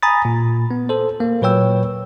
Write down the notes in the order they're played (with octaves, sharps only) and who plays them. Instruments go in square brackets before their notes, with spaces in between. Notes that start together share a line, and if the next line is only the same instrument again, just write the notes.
[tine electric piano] G#5 A#5 B5 D#6 A6
A#2
B3
A4 C5
A#3
A#2 F#3 B4 C#5 G5 E6